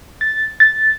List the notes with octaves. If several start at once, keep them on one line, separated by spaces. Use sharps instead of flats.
A6
A6